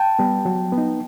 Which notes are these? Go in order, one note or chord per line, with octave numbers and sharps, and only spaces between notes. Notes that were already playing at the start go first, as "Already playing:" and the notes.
Already playing: G5 A5
G3 B3
F#3
B3
D#4